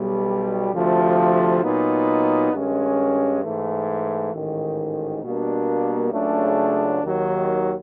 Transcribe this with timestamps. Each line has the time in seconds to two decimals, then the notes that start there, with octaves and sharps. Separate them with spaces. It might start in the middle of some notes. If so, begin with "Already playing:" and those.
Already playing: B1 B2 G3
0.72 D2 C3 F3 A3
1.62 A#2 F#3 B3 D#4
2.52 G2 D#3 G#3 C#4
3.42 G#2 E3 A3
4.32 A1 G#2 D#3
5.22 B2 G3 A#3 D4
6.12 C#2 C#3 F#3 A3 D4
7.02 D#2 D#3 F#3